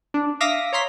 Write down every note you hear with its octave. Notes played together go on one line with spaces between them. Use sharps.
D4
E5 F5 D6 D#6 A#6 B6
C#5 A#5 C6 B6